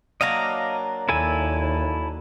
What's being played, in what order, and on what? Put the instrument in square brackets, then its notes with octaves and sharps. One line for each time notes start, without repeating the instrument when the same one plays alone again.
[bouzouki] F#3 A#3 D4 [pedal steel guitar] D#5 F5 A#5
[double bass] D#2 [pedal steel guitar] E4 A4 G#5